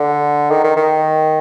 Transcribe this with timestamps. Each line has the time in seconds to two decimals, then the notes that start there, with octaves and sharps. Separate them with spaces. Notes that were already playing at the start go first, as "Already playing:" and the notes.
Already playing: D3
0.50 D#3
0.64 D#3
0.76 D#3